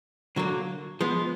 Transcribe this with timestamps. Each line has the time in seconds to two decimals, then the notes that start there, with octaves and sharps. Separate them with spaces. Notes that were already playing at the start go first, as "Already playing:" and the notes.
0.36 D3 F#3 A#3
1.01 F3 G#3 B3